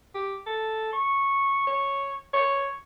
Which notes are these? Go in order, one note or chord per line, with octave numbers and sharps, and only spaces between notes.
G4
A4
C#6
C#5
C#5